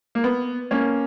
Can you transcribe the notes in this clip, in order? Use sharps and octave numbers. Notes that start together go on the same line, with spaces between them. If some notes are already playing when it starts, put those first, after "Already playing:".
A#3
B3
A#3 C#4